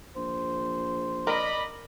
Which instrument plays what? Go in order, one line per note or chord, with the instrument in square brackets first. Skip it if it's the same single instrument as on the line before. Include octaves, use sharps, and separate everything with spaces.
[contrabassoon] A#1 [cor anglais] C5
[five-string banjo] A#4 [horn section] D5 D#5 B5